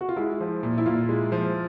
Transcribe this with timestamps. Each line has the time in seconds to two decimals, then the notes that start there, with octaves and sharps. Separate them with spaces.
0.01 F#4
0.09 F4
0.16 G#3 E4
0.40 F3
0.63 A#2
0.78 E4
0.86 A#2 F4
1.09 G#3
1.32 F3